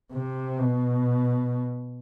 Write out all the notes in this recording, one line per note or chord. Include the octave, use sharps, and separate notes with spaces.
C3
B2